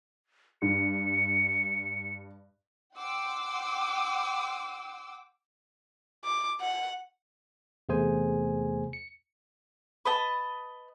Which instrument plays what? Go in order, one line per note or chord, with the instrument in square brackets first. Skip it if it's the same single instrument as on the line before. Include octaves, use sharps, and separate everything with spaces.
[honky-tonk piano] G2 [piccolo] C#7
[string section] F#5 G5 C6 D6 E6
[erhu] D6
F#5
[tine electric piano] E2 C3 A3 G#4 C5 G#5
C#7
[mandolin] B4 D#5 A5